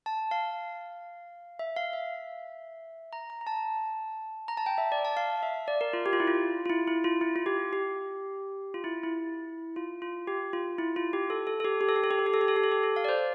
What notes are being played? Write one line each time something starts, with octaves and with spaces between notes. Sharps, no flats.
A5
F5
E5
F5
E5
A#5
A#5
A#5
A5
A#5
A5
G5
E5
D5
A5
F5
E5
D5
A#4
F4
G4
F4
E4
F4
F4
E4
E4
F4
E4
F4
G4
G4
F4
E4
E4
F4
F4
G4
F4
E4
F4
G4
A4
A4
A4
G4
G4
A4
G4
A4
G4
A4
G4
A4
G4
A4
G4
A4
G4
A4
F5
D5
C5